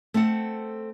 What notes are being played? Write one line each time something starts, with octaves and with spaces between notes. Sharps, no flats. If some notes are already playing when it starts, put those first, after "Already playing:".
A3 C4 A4 F#5